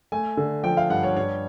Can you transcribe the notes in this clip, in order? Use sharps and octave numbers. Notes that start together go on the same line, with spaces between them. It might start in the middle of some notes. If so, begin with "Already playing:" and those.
A3 G#5
D3
F3 G5
F5
G2 F#5
C#5
G2 C#5